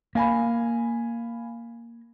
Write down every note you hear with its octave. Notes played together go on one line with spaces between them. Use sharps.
A#3 F5 G#5 B5